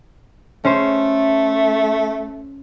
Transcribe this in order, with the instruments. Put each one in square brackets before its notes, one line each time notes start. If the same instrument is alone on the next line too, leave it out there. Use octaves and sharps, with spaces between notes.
[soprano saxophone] A3 [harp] C#4 C5